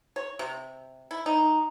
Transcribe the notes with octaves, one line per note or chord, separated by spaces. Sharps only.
C#5
C3
E4
D#4